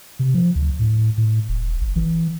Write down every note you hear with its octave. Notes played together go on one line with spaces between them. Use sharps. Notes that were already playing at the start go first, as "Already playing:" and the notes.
C3
F3
D2
A2
A2
E1
G#1
E3